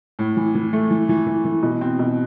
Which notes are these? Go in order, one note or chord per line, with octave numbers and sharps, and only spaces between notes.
A2
E3
E3
A3
E3
E3
E3
E3
B2
C4
B2